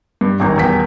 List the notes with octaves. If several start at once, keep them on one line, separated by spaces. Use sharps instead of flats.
G2
D#1 G#1 A#5
D#1 E2 G5 B6